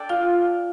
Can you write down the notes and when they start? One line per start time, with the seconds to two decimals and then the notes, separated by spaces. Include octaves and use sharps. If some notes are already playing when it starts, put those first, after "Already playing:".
Already playing: D4 A4 D5 G5
0.09 F4 F5